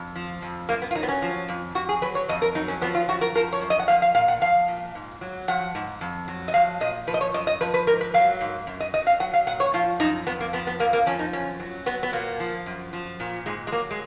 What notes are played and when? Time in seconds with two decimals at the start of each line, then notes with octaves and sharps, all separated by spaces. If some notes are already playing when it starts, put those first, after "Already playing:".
Already playing: F2
0.16 F3
0.42 F2
0.69 F#2 A#3
0.82 B3
0.91 F4
0.95 F#3 D#4
1.03 B3
1.09 C#4
1.22 F3
1.49 F2
1.75 F2 F#4
1.89 G#4
2.02 F#3 B4
2.15 C#5
2.29 F2 D#5
2.42 A#4
2.55 F#3 D#4
2.68 C#4
2.81 F3 B3
2.95 F4
3.09 F#2 F#4
3.21 A#4
3.35 F3 A#4
3.53 C#5
3.61 F#2
3.70 D#5
3.79 F#5
3.88 F3 F5
4.02 F5
4.15 A#2 F5
4.28 F#5
4.41 F3 F5
4.68 A#2
4.95 G#2
5.21 F#3
5.48 F3 F#5
5.75 G#2
6.01 F2
6.28 F#3
6.48 D#5
6.54 F3 F5
6.80 A#2 D#5
7.07 F3 B4
7.14 D#5
7.21 C#5
7.34 F#2 D#5
7.47 D#5
7.61 F3 B4
7.74 B4
7.87 G#2 A#4
8.01 B4
8.14 F#3 F5
8.41 G#2
8.67 F#2
8.80 D#5
8.94 F#3 D#5
9.07 F5
9.20 F#3 F#5
9.34 F5
9.47 A#2 F#5
9.60 C#5
9.74 F3 F4
10.00 F#2 D#4
10.27 F2 B3
10.40 A#3
10.53 F3 B3
10.67 B3
10.79 F2 A#3
10.93 A#3
11.06 F3 C#4
11.19 D#4
11.33 F#2 C#4
11.60 F#3
11.86 F#3 B3
12.03 B3
12.13 A#2 A#3
12.40 F3
12.66 F#2
12.93 F3
13.20 A#2
13.46 G#2 G#3
13.67 G#3
13.72 F#3 A#3
13.91 G#3